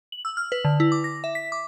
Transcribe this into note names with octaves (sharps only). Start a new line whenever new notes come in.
F#7
E6
F6
B4
D3
E4
D6
A#6
E5
B6
D6